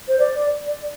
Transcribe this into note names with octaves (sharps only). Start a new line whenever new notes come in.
C5
D5
D5